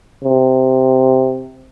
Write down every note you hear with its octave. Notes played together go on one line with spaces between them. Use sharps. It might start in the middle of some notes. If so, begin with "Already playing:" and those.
C3